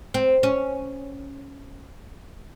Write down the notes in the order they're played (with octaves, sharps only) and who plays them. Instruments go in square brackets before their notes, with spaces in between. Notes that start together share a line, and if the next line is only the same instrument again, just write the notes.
[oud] C4
C#4